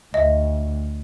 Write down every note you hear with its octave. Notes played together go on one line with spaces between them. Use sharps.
D2 D#5 E5